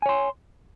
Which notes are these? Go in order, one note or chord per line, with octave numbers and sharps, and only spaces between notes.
C#5 G#5 C6